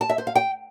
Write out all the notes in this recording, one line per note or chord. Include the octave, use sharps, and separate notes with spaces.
A5
E5
C5
F5
G5